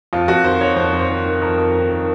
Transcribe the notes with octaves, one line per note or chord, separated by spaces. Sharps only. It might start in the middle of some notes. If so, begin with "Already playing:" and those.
F2 F4
F2 F#4
D#3 C5
D#3 C#5
F2 C5
F2
C5
D#3
D#3
F2 A#4
F2
D#3
D#3